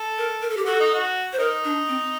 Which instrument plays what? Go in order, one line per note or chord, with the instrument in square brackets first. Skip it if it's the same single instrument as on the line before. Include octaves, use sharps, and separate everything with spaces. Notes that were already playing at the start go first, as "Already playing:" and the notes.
Already playing: [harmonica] A4
[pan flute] A#4
A#4
A4
G4
[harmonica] F#4 [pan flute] A4
[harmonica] D#4
F#4
[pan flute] C5
[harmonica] D#4 [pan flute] A#4
[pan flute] D4
C4